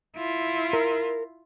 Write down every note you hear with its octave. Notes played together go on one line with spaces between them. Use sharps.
E4 F4
A#4